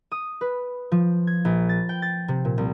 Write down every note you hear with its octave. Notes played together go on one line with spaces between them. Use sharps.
D#6
B4
F3
G#6
A#1
A6
G5
A6
C3
A#2
C2